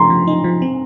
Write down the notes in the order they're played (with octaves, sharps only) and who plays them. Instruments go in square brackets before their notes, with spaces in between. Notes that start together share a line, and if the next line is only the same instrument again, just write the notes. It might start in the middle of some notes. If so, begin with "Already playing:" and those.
Already playing: [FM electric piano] F3 [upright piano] A#5 C6
[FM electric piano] F3
D#4
F3
C4